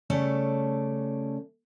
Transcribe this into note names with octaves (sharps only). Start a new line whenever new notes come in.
C#3 G3 A3 C#4 A4 A5